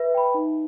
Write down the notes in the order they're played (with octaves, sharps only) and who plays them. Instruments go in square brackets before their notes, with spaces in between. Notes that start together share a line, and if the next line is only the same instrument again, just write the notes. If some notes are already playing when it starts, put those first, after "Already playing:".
Already playing: [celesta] B4 [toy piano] E5
[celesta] G5 B5
D#4